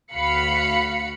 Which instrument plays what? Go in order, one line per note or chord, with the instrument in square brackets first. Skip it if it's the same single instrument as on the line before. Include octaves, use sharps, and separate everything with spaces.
[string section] D2 F#4 F5 B5 C#7